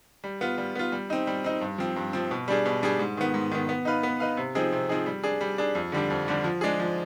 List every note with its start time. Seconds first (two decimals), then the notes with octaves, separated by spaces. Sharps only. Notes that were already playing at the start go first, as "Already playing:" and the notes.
0.24 G3
0.41 B3 F4
0.58 G3
0.75 B3 F4
0.92 G3
1.10 C4 D#4
1.27 G3
1.44 C4 D#4
1.61 G2
1.78 F3 C4
1.96 G2
2.13 F3 C4
2.31 B2
2.48 G3 D4 G#4
2.66 B2
2.83 G3 D4 G#4
2.99 G#2
3.17 D#3 B3
3.34 G#2
3.52 D#3 B3
3.69 B3
3.85 D#4 B4 F5
4.03 B3
4.20 D#4 B4 F5
4.37 C3
4.55 F3 C4 D#4 G#4
4.73 C3
4.89 F3 C4 D#4 G#4
5.06 G3
5.24 D4 G#4
5.41 G3
5.58 D4 G#4
5.75 F2
5.92 D3 G3 D4
6.10 F2
6.28 D3 G3 D4
6.44 F3
6.61 G#3 D4 G#4
6.79 F3